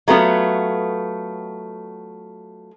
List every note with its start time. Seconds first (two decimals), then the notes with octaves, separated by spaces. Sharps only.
0.08 F#3 A3 B3 F4